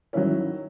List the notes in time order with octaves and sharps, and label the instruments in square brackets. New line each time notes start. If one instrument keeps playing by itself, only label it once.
[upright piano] D#3 F#3 C#4 E4